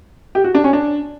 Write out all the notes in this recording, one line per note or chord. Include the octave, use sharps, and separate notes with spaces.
G4
F#4
D4
C#4
D4